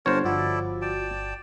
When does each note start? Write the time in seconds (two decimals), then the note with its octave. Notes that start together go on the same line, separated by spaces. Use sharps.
0.06 G1 A#4 C5 C#5 F#5 A5
0.24 G1 F3 E4 F#4 A4 D5
0.82 D5 G5 A5